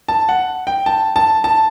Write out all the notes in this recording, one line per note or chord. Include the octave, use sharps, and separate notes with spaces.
A5
F#5
G5
A5
A5
A5